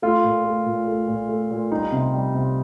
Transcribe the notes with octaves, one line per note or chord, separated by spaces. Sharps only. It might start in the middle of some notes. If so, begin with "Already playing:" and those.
A3 F4
A#2
A3
A#2
A3
A#2
A3
A#2
G3 D#4
C3
G3
C3